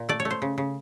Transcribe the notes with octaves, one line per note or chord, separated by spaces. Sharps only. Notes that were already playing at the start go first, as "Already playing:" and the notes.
Already playing: A#2
A3 D5
C#5
A3
C5
C#3
C#3